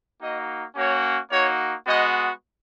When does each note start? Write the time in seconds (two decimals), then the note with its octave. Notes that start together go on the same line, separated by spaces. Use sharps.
0.20 A#3 D#4 F#4 D#5
0.75 A#3 C#4 F#4 C#5
1.31 A#3 D#4 F#4 C#5
1.86 G#3 B3 F#4 D#5